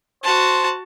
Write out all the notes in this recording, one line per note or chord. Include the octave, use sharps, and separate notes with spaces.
F#4 C5 A5